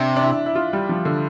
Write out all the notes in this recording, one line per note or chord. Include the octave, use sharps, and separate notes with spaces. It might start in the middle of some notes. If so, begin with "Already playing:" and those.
Already playing: C3 D4
D4
E4
E4
F4
G3
F3
D3